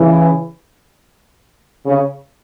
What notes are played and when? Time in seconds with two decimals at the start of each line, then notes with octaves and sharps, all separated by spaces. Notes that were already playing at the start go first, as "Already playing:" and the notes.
Already playing: C#3 E3
1.86 C#3